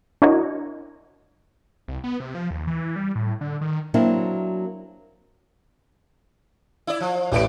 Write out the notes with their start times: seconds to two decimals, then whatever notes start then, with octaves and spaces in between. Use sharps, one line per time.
0.22 D4 E4 F#4 A#4 C#5 D#5
1.88 C2
2.04 B3
2.20 C3
2.35 F3
2.51 D#2
2.67 E3
2.96 G3
3.16 A2
3.41 D3
3.61 D#3
3.94 F#3 A#3 C4 D4 E4
6.87 E4 D5
7.01 F3
7.32 A1 A2 G4 B4 D5 D7